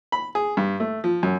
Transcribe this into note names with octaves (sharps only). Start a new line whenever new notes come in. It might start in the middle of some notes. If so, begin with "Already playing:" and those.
B5
G#4
G2
A3
F3
F#2